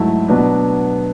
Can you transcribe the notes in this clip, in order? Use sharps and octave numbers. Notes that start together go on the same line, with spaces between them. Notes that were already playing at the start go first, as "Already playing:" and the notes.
Already playing: G#2 F#3 A3 E4 A4
B2 F#3 B3 D4